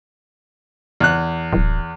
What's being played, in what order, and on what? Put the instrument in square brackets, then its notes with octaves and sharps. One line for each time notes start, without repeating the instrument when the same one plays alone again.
[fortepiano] E2 F#6
[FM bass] D1